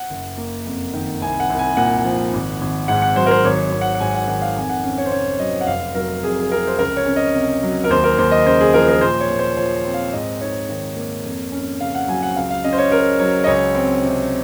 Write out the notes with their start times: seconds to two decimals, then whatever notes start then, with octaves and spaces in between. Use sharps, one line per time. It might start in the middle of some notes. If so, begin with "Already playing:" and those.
Already playing: F#5
0.10 F#1
0.38 A#3
0.66 F2
0.94 D#3
1.22 C2 G#5
1.40 F#5
1.50 C2
1.59 G#5
1.77 A#2 F#5
2.05 F3
2.33 G#1
2.61 G#1
2.88 G#2 F#5
3.02 F#5
3.16 F#3 C5
3.26 A#4
3.31 C5
3.45 G#1 C#5
3.72 G#1
3.81 F#5
3.95 F#5
4.00 G#2 G#5
4.15 F#5
4.27 D#3 F#5
4.42 F5
4.56 F2 G#5
4.69 F#5
4.83 C#4
4.98 C#5
5.06 C5
5.11 C3 C#5
5.39 F#3 D#5
5.61 F#5
5.67 F1 F5
5.95 F#3 A#4
6.23 F2 G#4
6.40 G#4
6.51 C3 A#4
6.67 C5
6.78 C#2 A#4
6.97 C#5
7.06 C#4
7.16 D#5
7.34 C3
7.63 F#3
7.84 A#4
7.90 D#2 C5
8.04 A#4
8.18 D#2 C5
8.31 D#5
8.46 C#3 C5
8.60 G#4
8.73 F3 A#4
8.88 A#4
9.01 A#2 C5
9.20 C#5
9.30 A#2
9.39 C5
9.57 F3 C#5
9.85 C4
9.94 F5
10.13 G#2 D#5
10.41 D#4 C#5
10.69 D#3
10.97 A#3
11.25 F2
11.52 C#4
11.80 C#3 F5
11.95 F#5
12.08 F#3 G#5
12.23 F#5
12.36 C#2 F5
12.50 F5
12.64 C#4 D#5
12.73 C5
12.78 C#5
12.91 C#3 A#4
13.19 F#3 C#5
13.44 D#5
13.47 C#2 C#5
13.75 C4
14.03 C3